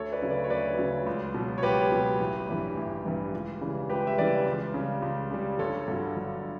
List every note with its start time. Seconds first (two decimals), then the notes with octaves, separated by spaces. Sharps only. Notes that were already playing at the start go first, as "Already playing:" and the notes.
Already playing: D2 A4 C#5
0.12 B4 D5
0.22 C#3 F#3
0.31 B4 D5
0.44 C#5
0.50 D2 B4 D5
0.78 C#3 F#3
1.07 C#2
1.34 B2 F#3
1.58 C#5
1.63 C#2 G4 B4
1.92 B2 F#3
2.20 A1
2.48 G2 E3 G3
2.77 A1
3.04 G2 E3 G3
3.33 C#2
3.61 C#3 E3 G3
3.90 C#2 G4 B4
4.07 E5
4.18 C#3 E3 G3 B4 D5
4.46 C#2
4.74 C#3 G3
5.02 C#2
5.31 C#3 G3
5.59 G1 A4 C#5
5.88 G2 D3 F#3
6.16 G1